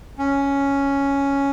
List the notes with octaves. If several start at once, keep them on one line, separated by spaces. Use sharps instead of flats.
C#4